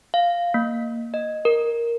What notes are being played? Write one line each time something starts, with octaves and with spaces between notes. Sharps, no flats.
F5
A#3
D#5
A#4